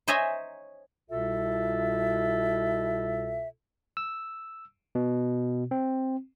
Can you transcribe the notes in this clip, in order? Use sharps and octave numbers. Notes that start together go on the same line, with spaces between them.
C5 C#5 D#5 E5 G#5 A#5
C2 B2 F4 A4 E5
E6
B2
C4